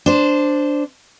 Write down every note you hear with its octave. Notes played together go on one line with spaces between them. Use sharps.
D4 C5